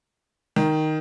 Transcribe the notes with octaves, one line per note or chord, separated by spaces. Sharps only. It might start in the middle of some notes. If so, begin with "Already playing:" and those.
D#3